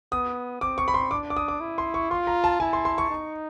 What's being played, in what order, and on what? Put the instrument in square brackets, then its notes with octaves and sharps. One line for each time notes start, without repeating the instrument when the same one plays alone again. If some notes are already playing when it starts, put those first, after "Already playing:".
[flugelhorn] B3 [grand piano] D#6
[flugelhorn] C4 [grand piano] D6
[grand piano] C#6
B5
C6
[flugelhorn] D4 [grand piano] D6
[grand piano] D6
D#6
D6
[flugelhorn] E4
[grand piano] C6
C#6
[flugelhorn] F4 [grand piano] C6
[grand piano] A#5
A5
[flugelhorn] E4 [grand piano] G#5
[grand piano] C6
C6
C#6
[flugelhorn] D#4